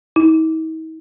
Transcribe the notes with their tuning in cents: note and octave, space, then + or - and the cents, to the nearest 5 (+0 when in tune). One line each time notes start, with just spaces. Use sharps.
D#4 +45